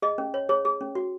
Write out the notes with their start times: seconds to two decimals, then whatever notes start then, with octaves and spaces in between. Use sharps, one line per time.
0.02 G#4 D#5
0.18 C#4
0.34 C#5
0.49 G#4 C#5
0.65 G#4
0.81 C#4
0.95 F#4